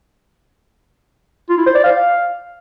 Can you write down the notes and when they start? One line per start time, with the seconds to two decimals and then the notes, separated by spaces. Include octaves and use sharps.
1.49 F4
1.58 E4
1.66 C5
1.75 D5
1.84 F5